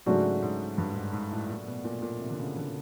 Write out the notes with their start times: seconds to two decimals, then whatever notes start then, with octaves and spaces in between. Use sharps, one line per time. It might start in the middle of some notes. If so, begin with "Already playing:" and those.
0.06 G#2 C#3 F#3 A3 D4 F#4
0.42 G#2
0.78 G2
0.95 G#2
1.13 G#2
1.31 A2
1.50 A#2
1.67 B2
1.84 A#2
2.02 A#2
2.20 C3
2.30 D3
2.38 C#3
2.57 D3